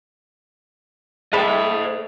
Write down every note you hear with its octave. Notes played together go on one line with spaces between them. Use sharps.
A3 G#4 C5 D#5 G5 A5 B5